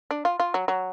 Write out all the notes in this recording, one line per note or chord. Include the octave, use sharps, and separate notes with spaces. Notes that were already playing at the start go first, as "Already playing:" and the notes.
D4
F4
F4
F#3
F#3